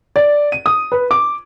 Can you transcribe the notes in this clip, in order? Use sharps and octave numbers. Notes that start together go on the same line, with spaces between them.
D5
D#7
D#6
B4
D6